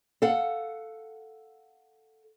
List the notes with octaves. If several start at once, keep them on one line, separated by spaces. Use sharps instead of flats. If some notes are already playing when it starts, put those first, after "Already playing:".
A4 F5 F#5